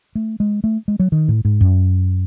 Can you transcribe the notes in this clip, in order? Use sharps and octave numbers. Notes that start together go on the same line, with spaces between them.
A3
G#3
A3
G#3
F#3
D#3
A2
G#2
F#2